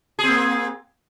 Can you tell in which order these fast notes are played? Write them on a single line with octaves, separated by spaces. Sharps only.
G#4 C4 A#3